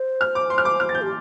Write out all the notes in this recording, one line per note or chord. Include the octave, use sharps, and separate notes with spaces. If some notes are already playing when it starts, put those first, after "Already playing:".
Already playing: C5
F6
D6
C6
F6
D6
F6
A6
G6
G4